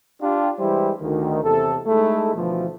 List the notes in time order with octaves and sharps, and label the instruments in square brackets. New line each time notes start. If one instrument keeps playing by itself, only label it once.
[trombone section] D4 F4 G4
E3 G3 G#3 E4 G4 C5
D2 D#3
E2 C3 A4
G#3 A3 D#4 E4 A4
D2 B2 E3 F3